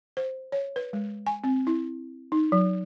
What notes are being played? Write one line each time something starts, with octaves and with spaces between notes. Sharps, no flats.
C5
C#5
B4
G#3
G#5
C4
E4
D#4
F#3